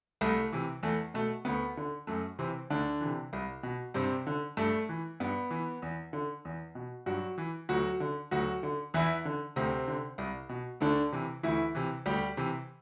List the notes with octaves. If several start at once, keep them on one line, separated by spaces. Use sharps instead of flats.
C2 A3
C3 E3
E2 A3
B2 A3
D2 B3
D3
F#2 A3
C3 E3 C4
D2 D3 D4
C3 E3
C2
B2
G2 C3 C4
D3
G2 A3
E3
G2 B3
E3
E2
D3
E2
B2
G2 F#3 F#4
E3
D2 F#3 F#4
D3
D2 F#3 F#4
D3
E2 E3 E4
D3
D2 C3 C4
D3
C2
B2
D2 D3 D4
C3 E3
D2 E3 E4
C3 E3
D2 G3 G4
C3 E3